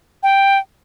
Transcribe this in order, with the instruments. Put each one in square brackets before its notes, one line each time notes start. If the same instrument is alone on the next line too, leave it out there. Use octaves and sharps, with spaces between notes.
[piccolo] G5